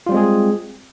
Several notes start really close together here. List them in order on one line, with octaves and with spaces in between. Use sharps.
F4 G3 C4 G#3 G#4